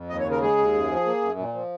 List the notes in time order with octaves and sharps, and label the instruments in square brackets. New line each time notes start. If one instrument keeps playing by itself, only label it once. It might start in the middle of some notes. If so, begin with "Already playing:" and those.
Already playing: [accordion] F2
D#2 D#5
C#5
C#3
A#4
G#3 G#4
D#2
F#2
F3
A#3
F#2
A#2
F3